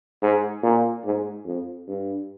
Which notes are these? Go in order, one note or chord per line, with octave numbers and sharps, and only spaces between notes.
G#2
A#2
G#2
F2
G2